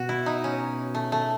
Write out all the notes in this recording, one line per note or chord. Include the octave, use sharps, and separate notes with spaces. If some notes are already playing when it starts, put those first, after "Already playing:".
Already playing: B2 F#4
E4
D#4
C#4
A3
A3